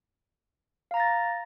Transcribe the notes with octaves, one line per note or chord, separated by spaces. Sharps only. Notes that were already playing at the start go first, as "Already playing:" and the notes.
F5 A#5 A6 A#6